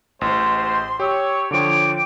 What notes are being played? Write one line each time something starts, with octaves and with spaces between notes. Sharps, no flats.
A1 G#3 C5 C6
G4 C#5 E6
D3 F3 C#5 G5 D6